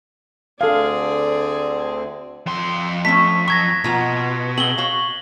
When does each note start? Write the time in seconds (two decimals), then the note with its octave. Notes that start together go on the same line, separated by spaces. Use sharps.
0.61 D2 D3 C4 G#4 A4 D5 F5
2.46 F2 C6
3.05 A3 C4 C#4 B6
3.48 F#3 C#6 G#6 A#6
3.84 B2 A#3 F4 A#5
4.58 C4 F#4 G#4 F#7 G7
4.78 F#4 C#5 F5